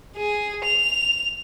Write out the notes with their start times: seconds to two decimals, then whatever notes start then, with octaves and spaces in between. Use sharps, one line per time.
0.16 G#4
0.64 F7